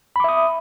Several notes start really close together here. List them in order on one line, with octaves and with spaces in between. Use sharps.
B5 D6 E5 D#6